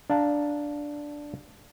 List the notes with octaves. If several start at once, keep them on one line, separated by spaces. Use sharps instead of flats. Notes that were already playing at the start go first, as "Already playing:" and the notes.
D4 F5 A5 A#5